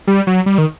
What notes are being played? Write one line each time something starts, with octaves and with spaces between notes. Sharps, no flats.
G3
F#3
G3
D#3